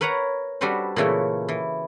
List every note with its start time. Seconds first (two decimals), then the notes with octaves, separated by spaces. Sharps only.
0.01 A#4 B4 C#5 F#5 A#5
0.61 G3 D4 F#4 A4 B4 C5
0.96 A#2 C#3 E3 A3 C#4 E4
1.49 E3